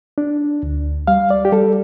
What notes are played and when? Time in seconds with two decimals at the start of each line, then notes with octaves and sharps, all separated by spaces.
0.18 D4
0.63 D2
1.07 G3 F5
1.30 D5
1.45 G4
1.52 G3 A4